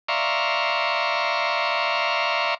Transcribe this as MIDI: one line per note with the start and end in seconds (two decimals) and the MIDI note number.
0.08 2.54 74
0.08 2.54 76
0.08 2.54 77
0.08 2.54 82
0.08 2.54 84
0.08 2.54 85